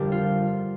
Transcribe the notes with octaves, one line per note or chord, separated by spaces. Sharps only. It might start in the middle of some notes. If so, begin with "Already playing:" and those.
Already playing: G1 F2 D3 G3 D4 G4 A#4 G5
F4